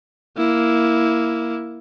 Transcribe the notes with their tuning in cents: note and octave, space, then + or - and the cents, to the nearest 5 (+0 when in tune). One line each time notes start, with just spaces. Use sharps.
A#3 +0 E4 +0